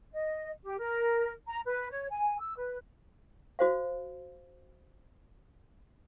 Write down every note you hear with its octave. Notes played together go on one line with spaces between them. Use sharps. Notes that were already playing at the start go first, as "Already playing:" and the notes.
D#5
G4
A#4
A#5
B4
C#5
G#5
E6
B4
F#4 C5 F5